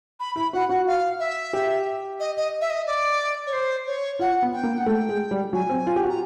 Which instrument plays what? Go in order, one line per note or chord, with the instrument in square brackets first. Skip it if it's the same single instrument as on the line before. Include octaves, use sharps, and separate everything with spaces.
[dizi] B5
[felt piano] E4 [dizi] B5
[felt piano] F#4 [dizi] F#5
[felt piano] F#4 [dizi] F#5
[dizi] F5
E5
[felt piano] G4
[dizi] D#5
D#5
E5
D#5
D5
C#5
C5
C#5
[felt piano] F4 [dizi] F#5
[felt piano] B3
[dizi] G5
[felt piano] A#3
[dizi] F#5
[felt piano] A3 [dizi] G5
[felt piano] G#3
G3
[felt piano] F#3 [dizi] G#5
[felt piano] C4
F4
G4
F#4
[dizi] A#5